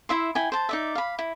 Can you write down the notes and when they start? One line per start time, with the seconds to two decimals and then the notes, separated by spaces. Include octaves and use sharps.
0.09 E4 E5 C6
0.35 E4 G5 G#5
0.52 C5 A5
0.69 D#4 D5 E5
0.95 F5 B5
1.19 E4